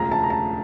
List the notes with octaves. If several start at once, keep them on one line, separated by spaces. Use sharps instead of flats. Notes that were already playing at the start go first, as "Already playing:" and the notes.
Already playing: E1 D2 C#3 F3 A#5
A5
A#5
A5